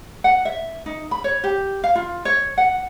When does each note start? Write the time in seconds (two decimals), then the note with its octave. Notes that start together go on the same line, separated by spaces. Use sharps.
0.24 F#5
0.45 E5
0.86 D#4
1.11 B5
1.24 C#5
1.44 G4
1.84 F5
1.95 F4
2.25 C#5
2.58 F#5